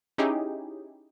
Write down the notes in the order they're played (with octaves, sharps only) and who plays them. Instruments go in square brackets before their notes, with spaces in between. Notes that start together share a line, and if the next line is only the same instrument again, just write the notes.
[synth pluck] C#4 D#4 E4 G4 G#4